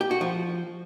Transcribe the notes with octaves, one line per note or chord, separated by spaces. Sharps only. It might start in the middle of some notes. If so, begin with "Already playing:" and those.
G4
F#4
F3